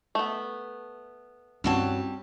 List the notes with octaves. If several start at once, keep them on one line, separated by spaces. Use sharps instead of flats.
A3 B3
G2 G3 C4 C#4 E4 F#4 C#5 A5